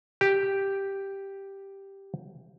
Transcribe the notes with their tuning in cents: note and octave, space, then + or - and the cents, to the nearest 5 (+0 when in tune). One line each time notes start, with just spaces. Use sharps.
G4 +0